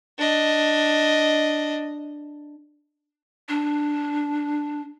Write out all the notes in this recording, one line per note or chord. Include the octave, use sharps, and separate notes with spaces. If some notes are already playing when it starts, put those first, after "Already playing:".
D4 D#5
D4